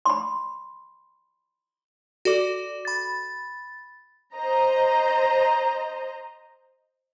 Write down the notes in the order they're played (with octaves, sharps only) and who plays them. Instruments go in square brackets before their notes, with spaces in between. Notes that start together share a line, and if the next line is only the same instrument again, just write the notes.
[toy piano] B5 C6
[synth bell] F#4 A4 D5 D6
B5 A6
[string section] C5 D#5 A#5